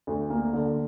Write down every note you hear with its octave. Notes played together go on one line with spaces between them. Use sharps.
D2
A#3
D3